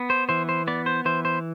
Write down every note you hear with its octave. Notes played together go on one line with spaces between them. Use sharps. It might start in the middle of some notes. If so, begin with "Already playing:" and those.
Already playing: B3
C5
E3 C5
C5
B3 D5
C5
E3 C5
C5